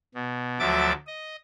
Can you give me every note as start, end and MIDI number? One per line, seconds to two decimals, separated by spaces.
0.15 0.59 47
0.59 0.93 38
0.59 0.93 53
0.59 0.93 54
0.59 0.93 76
0.59 0.93 86
0.59 0.93 93
1.07 1.36 75